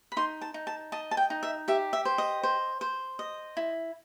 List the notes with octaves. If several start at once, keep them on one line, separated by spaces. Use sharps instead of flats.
B5
D#4 C6
A5
D#4
A5
D#5 A5
A5
G5
D#4
E5
G4 E5
E5
C5
D#5
C5
C5
D#5
E4